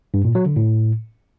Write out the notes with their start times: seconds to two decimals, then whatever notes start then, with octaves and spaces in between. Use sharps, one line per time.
0.14 G2
0.24 A#2
0.35 F#3
0.46 D3
0.56 A2